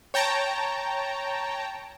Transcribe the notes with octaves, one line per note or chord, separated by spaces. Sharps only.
C#5 G5 A5 A#5